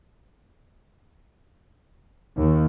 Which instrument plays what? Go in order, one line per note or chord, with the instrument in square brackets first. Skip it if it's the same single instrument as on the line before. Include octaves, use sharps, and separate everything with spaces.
[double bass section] D#2